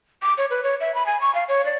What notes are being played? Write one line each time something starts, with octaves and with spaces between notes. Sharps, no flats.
D6
C#5
B4
C#5
E5
B5
G#5
C#6
F5
C#5
D5